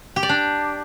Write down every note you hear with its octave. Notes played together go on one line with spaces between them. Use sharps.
G4
D5
D4